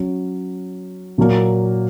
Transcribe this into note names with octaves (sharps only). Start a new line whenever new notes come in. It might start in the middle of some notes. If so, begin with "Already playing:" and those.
Already playing: F#3 C#4
A#2 F#3 A#3